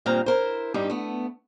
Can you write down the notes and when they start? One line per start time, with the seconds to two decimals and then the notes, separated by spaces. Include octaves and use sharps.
0.06 G2 A#2 D#3 C4 F5 A#5
0.26 E4 A#4 C5
0.74 G2 G3 D#4 G4
0.90 A3 B3